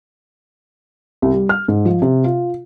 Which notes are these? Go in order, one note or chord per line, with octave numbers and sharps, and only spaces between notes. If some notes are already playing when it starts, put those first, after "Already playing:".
C2
G3
F6
G#2
F3
C3
F4